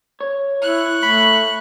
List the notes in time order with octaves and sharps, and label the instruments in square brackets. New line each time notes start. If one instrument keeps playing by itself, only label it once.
[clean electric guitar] C#5
[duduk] E4 [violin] C#6 F#6
[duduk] A3 [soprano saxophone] B5